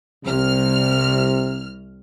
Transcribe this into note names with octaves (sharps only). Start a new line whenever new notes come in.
C2 C3 F6